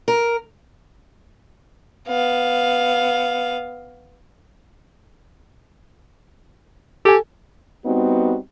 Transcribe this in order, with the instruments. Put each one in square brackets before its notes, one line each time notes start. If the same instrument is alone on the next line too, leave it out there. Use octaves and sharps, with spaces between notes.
[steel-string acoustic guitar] A#4
[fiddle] B3 F5
[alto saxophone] G4 [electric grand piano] A4 G#5
[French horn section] G3 B3 C4 D#4 F#4